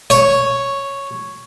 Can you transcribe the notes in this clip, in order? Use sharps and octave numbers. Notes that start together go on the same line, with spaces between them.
C#5